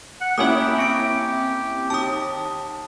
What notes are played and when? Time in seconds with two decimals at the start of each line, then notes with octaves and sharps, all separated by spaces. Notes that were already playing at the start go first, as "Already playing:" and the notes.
0.21 F#5
0.38 A#3 C#4 E4 G4 E5 D#6
0.79 C4 D7
1.90 D#2 A5 D#6